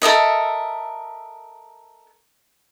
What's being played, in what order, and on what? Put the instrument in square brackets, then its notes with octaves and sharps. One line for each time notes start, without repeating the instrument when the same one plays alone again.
[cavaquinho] A4 A#4 D#5 E5